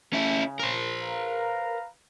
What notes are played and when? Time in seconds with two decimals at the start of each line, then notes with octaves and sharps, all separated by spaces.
0.13 C#3 C#4 E4
0.60 A#4 C5
1.02 B4 F5 A#5